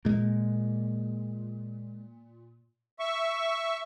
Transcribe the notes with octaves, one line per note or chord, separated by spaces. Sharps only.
A#2 G#3 A#3
E5 C#6